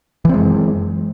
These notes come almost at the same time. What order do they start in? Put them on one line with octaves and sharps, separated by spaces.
E3 C4 G#3 F#2